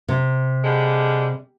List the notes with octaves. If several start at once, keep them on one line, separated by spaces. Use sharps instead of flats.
C3
D3 G3 G#3